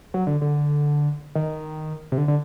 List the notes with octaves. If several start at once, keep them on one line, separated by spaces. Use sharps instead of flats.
F#3
D3
D3
D#3
C3
D3
D3